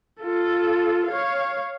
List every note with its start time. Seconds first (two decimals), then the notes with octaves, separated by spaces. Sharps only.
0.21 F4 A4
1.07 C#5 F5